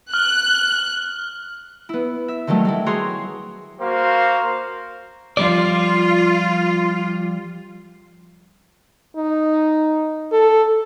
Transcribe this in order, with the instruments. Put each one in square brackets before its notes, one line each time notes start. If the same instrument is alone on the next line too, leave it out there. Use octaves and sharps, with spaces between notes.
[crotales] F6 [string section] F#6
[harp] B3 E4
E5
D3 D#3 F#3 G3 A3
G3 A3 E4
F#4 G#4 C#5 A#5 C6
[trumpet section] A#3 F#4 C5 F5
[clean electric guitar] F3 G3 D5 [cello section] F4
[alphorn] D#4
A4